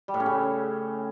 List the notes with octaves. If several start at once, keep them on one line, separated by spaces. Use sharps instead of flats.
G3
A2
C#4
C#3